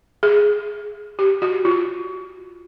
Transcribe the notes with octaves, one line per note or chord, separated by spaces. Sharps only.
G#4
G4
F#4
F4